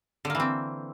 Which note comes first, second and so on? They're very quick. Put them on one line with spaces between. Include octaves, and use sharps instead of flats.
D3 A#3 E3 C4